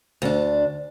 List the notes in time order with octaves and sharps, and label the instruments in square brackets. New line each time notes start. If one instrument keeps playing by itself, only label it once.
[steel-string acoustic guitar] D2 D4